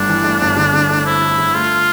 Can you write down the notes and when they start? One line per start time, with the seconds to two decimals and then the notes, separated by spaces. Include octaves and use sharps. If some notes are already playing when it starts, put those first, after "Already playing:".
Already playing: G1 G2 A3 D4
0.09 E3
0.24 A3
0.41 G1
0.57 D3
0.73 D3
0.90 A3
1.05 C4 E4
1.21 D3
1.38 D3
1.54 A3 F4